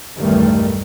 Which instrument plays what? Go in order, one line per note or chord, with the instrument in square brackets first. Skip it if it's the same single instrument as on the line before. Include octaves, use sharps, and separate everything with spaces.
[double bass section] B1 E2 G2 D#3 G3 A3